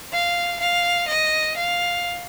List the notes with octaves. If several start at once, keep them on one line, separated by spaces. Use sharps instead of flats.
F5
F5
D#5
F5